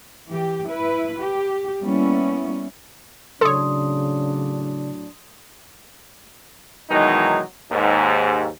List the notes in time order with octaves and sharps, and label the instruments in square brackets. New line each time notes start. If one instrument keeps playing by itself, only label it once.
[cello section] E3 G4
E4 B4
G4
G3 A#3 B3 C#4 E4
[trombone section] A2 F#3 D4 [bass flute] C#3 [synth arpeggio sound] A4 C#5 [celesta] C6 D#6
[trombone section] B2 D#3 E3 F#3 G#3 D#4
D#2 G#2